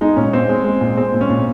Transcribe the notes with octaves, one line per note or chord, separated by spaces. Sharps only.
G#3 D#4
A#2 C#4
A#2 C4
G#3
G#3
A#2
G#3 C4
A#2
C#4
A#2